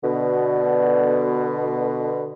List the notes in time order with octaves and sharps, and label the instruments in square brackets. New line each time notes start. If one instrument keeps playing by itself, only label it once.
[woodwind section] B2 D3